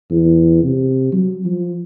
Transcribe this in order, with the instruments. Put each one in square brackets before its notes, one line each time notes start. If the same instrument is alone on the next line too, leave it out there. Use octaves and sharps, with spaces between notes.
[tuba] E2
C3
F#3
F3